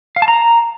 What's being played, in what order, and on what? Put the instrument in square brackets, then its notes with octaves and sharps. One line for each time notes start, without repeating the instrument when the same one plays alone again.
[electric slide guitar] F5
A5
A#5